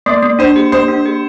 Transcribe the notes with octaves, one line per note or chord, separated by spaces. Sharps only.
A#3 D5
A#3
D4 C5
G4
A#3 C5
D4
G4